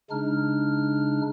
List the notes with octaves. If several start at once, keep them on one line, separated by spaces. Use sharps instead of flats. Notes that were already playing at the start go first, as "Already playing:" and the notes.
C#3 G#3 D4 D#4 F6